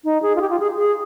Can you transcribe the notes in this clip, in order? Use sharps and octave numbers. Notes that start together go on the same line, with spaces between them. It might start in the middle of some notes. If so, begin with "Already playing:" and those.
D#4
G#4
F4
G4
F4
G#4
G#4